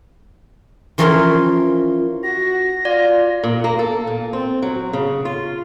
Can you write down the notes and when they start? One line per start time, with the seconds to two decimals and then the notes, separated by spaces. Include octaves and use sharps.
0.98 E3 F3 C#4 A#4 F5 C6
2.23 F#4 A#6
2.85 F4 D5
3.43 A#2
3.64 A#3
3.79 A4
4.07 A#2
4.33 C4
4.62 F#3
4.93 C#3
5.25 F4